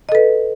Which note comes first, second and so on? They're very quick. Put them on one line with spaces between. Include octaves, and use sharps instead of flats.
D#5 A4 B4